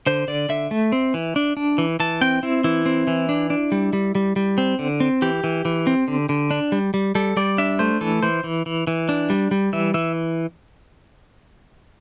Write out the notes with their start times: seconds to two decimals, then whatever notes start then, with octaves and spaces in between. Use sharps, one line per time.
0.07 D3 C5
0.28 D3 D5
0.49 D3 E5
0.71 A3
0.92 C4
1.14 E3
1.36 D4
1.57 D4
1.78 E3
2.00 E3 A5
2.21 C4 G5
2.43 C4 E4
2.64 E3 E4
2.86 C4
3.07 E3
3.29 D4
3.50 D4
3.72 G3
3.93 G3
4.15 G3
4.36 G3
4.58 C4
4.79 D3
5.00 C4
5.22 E3 G4
5.44 E3
5.65 E3
5.87 C4
6.08 D3
6.29 D3
6.51 D4
6.72 G3
6.94 G3
7.15 G3 A4
7.37 G3 D5
7.58 D4 E5
7.79 A3 C5
8.01 E3 A4
8.22 E3 C5
8.44 E3
8.66 E3
8.87 E3
9.09 D4
9.30 G3
9.51 G3
9.73 E3 E5
9.94 E3 E5